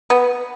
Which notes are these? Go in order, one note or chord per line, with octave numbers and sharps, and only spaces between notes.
B3